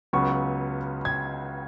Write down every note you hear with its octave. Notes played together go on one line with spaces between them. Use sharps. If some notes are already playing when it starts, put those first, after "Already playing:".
C#2 C#3 F#3 B3 C#6
G#6